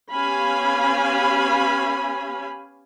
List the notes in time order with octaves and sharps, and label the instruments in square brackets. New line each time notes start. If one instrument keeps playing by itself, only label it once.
[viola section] B3 C#4 G4 F5 G#5 B5